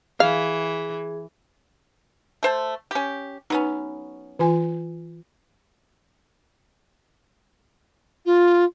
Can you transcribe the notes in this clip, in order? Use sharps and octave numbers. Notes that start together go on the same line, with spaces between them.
E3 G#4 F5
A3 C5 A5
C#4 G4
F#3 B3 C#4 D#4
E3 F4 G#5
F4